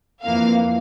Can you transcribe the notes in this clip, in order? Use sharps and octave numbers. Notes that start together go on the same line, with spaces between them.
F2 E3 A#3 F5